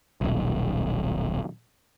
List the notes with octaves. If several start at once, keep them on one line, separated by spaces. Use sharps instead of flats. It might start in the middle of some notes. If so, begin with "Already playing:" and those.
D#1 B1